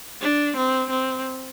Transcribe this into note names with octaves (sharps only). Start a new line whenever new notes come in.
D4
C4
C4